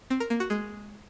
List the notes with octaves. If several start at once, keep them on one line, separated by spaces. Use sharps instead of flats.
C4
A#4
A#3
F#4
G#3